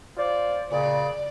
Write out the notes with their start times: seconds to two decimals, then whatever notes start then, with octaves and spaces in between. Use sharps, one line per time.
0.17 F4 C5 D5
0.71 A#2 C#3 D5